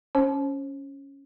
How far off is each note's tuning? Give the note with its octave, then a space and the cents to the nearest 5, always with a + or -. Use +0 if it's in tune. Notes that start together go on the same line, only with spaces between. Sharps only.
C#4 +0 C5 +35 A5 -35